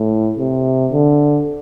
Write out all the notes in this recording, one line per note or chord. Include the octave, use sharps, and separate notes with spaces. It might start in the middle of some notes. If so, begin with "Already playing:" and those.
Already playing: A2
C3
D3